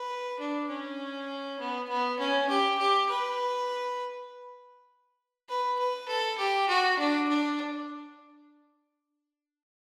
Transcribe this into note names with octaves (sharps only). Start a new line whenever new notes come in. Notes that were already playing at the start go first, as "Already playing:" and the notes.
Already playing: B4
D4
C#4
B3
B3
C#4
G4
G4
B4
B4
B4
A4
G4
F#4
D4
D4